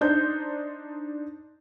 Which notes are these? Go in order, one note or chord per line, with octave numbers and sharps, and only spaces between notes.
D4 D#4 C5 G6